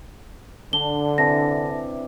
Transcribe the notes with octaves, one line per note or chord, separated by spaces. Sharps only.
D3 D4 G7
C3 E3 A5 A#6